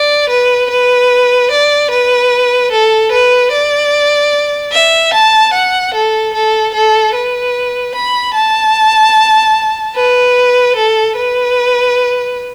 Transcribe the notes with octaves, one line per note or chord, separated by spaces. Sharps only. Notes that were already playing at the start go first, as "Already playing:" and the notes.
Already playing: D5
B4
B4
D5
B4
A4
B4
D5
E5
A5
F#5
A4
A4
A4
B4
B5
A5
B4
A4
B4